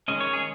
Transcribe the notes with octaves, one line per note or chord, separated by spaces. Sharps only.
D#3 G#3 C#4 D#5
C#5
G#4